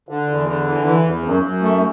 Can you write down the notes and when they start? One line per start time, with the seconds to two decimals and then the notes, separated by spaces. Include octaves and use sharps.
0.09 D3
0.29 E2
0.47 D3
0.66 E3
0.85 E3
1.05 E2
1.24 F#2
1.42 F#2
1.62 A3